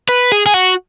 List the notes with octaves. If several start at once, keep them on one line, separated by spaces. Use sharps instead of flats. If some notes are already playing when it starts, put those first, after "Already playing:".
B4
G#4
G#4
F#4